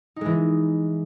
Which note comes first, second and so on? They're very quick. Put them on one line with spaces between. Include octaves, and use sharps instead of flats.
D#4 G#3 E3